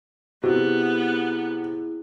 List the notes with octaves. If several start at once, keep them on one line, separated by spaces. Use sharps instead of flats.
C3 B3 E4 F#4 G#4